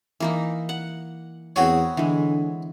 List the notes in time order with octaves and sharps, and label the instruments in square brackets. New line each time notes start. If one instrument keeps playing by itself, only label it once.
[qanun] E3 A#3 D#4
F#5
[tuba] E2 [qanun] B3 C4 G#4 [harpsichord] F#4 C#5
[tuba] D3 [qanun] E3 G#3